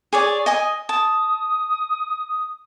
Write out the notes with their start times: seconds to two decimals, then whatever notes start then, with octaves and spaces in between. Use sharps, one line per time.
0.13 G#4 C#5 D5
0.46 D#5 G#5 D#6
0.89 A5 D#6